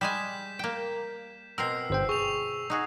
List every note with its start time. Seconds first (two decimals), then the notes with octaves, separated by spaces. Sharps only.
0.01 G3 G#3 G#5 G6 B6 E7
0.59 A#3 G5
1.58 B2 C4 A#4 E6 C7
1.90 G1 C5 G5
2.09 G#4 C#6 F7
2.70 D#4 F#4 G#4